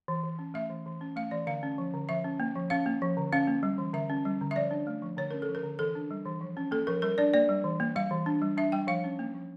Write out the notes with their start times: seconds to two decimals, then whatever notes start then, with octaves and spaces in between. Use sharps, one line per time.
0.08 E3
0.24 E3
0.39 C#4
0.54 A3 E5
0.70 E3
0.86 E3
1.01 C#4
1.16 A3 F5
1.31 E3 D5
1.47 D3 F5
1.63 C#4
1.78 F3
1.94 D3
2.09 F3 E5
2.24 C#4
2.40 A#3
2.55 F3
2.70 C#4 F5
2.86 A#3
3.02 F3
3.17 D3
3.32 C#4 F5
3.47 A#3
3.63 G3
3.78 E3
3.93 D3 E5
4.10 C#4
4.25 G3
4.41 D3
4.51 E5
4.56 F3 D5
4.71 D4
4.87 A3
5.02 F3
5.17 D3 C#5
5.31 C#4 A#4
5.42 A4
5.48 F3
5.55 A#4
5.63 D3
5.79 E3 A4
5.95 D4
6.11 G3
6.26 E3
6.41 F3
6.57 C#4
6.71 A#3 A4
6.87 F3 A#4
7.02 G3 A#4
7.18 D4 D5
7.34 A#3 D5
7.49 G3
7.64 E3
7.80 A#3
7.96 G3 F5
8.11 E3
8.26 D4
8.42 G3
8.57 D4 E5
8.72 G3 G5
8.87 F3 F5
9.04 C#4
9.19 A#3
9.34 F3